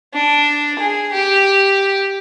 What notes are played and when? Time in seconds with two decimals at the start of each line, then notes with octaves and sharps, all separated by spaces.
0.14 D4
0.79 G#4
1.12 G4